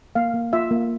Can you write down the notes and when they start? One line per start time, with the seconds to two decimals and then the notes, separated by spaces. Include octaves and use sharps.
0.15 A#3 F5
0.34 A#3
0.53 F4 E5
0.71 A#3